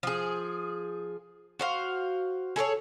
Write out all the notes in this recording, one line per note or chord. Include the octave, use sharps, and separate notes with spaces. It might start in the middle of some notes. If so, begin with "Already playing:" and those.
F3 G#4
F#4 C5 F5
G#4 A4 C5 C#5